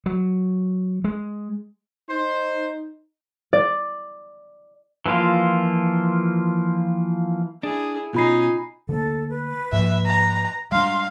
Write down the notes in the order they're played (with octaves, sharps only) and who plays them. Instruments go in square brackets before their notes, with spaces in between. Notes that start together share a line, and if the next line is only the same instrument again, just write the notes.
[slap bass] F#3
G#3
[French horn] D#4 [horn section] C5
[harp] D5
[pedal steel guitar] E3 F3 A#3 F4
[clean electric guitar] D4 [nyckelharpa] E4 G#4
[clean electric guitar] B2 C#4 [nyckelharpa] D#4 G#5 [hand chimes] F4 B5 C7
[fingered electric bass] D3 A3 A#3 [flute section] A4
[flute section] B4
[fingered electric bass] G#2 F3 A#3 [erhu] E5
[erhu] A#5
[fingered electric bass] G3 G#3 D4 [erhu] F5 [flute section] A#5 C6 F6